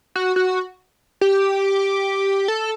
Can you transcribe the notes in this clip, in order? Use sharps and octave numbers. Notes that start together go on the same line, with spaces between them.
F#4
F#4
G4
A4